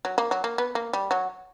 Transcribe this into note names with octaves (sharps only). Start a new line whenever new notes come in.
F#3
A#3
F#3
A#3
B3
A#3
G3
F#3